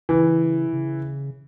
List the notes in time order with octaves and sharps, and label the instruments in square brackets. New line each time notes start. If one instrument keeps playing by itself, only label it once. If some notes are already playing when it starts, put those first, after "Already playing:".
[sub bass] C#3 [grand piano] E3
[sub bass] C#3